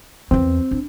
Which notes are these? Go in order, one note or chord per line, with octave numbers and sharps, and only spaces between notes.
E2 C4 E4
D4